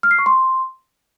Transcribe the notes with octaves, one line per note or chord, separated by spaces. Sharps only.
F6
C7
C#6
C6